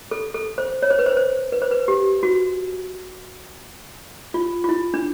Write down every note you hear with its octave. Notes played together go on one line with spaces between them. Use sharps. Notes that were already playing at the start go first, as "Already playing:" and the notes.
A4
A4
C5
C#5
C5
B4
C5
C5
B4
C5
B4
G4
F#4
F4
F4
E4
D4